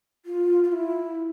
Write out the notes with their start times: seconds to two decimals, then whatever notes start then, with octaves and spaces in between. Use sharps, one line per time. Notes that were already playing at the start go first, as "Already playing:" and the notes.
0.25 F4
0.64 F4
0.72 E4